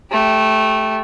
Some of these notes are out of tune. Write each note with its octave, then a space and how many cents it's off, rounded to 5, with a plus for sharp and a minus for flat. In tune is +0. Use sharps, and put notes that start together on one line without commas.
A3 -10 G4 +0